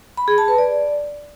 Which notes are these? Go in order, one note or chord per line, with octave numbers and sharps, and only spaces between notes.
B5
G#4
A5
B4
D5